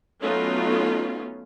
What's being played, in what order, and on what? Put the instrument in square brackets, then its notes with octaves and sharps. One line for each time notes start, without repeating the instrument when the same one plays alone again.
[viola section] F#3 A3 B3 C#4 D#4 F4